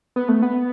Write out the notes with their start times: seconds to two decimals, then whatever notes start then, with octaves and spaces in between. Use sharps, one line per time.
0.16 B3
0.29 A3
0.42 B3